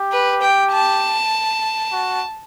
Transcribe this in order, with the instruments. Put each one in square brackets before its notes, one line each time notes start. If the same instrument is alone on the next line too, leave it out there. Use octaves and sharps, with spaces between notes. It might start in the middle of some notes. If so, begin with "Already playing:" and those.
Already playing: [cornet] G4
[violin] B4
G5
A5
[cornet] F#4